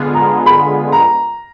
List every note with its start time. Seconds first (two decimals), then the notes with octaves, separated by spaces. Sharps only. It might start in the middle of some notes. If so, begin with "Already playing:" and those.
Already playing: D3 G#3 B3 F4 G#4
0.14 A#5
0.46 B5
0.92 A#5